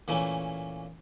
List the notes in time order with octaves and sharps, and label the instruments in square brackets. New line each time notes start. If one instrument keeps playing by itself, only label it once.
[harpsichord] A#2 E3 A3 A#3 C#4